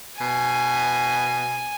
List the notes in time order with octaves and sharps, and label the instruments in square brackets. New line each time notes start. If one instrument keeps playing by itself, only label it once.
[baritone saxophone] B2 [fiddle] G#5